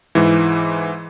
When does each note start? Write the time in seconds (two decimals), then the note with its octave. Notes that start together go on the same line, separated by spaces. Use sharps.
0.15 G#2 E3